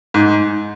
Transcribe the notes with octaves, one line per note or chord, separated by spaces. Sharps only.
G#2